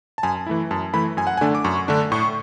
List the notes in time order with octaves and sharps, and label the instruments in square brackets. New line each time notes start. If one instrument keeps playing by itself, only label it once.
[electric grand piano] A5
F#2 G#5
E3 A3 E4
F#2 A5
E3 A3 E4 B5
F#2 G#5
F#5
G#5
D3 A3 D4
D6
F#2 C#6
D3 A3 D4
A2 C#6